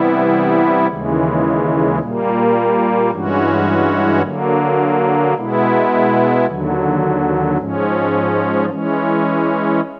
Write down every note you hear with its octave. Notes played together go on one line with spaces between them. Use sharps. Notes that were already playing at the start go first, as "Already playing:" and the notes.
Already playing: C3 E3 G3 B3 E4
D#2 C#3 E3 G#3
A#2 G3 A#3
G2 E3 G#3 C#4 F#4
D3 F#3 A#3
B2 G#3 B3 E4
D#2 D3 F#3
G#2 F3 G#3 C#4
E3 G#3 C#4